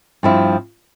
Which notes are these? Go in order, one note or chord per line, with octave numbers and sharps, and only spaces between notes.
G2 F3 C4 E4